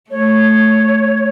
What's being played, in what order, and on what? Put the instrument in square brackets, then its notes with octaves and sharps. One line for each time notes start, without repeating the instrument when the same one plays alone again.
[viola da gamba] A3 [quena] C#5